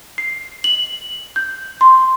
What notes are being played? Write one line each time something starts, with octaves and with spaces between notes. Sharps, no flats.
C7
F#7
G6
C6